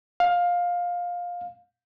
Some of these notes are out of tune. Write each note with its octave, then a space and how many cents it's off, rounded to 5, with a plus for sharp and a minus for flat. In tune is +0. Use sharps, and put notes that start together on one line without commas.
F5 +15